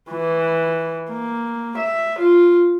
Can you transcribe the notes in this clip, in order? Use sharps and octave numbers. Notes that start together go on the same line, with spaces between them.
E3
A#3
E5
F4